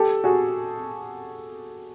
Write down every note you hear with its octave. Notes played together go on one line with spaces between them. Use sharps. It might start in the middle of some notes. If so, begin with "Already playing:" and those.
Already playing: G4 A4
F#4 G#4